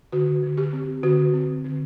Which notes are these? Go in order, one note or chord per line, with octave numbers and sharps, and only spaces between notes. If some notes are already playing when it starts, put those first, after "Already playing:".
D3 F#4
D3
G4
C4
D3 F#4
C4
D3